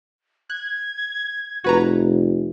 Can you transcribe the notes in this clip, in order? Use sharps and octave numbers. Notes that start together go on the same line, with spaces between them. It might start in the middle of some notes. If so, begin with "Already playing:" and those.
F#6 G#6
F1 F#4 B4 A#5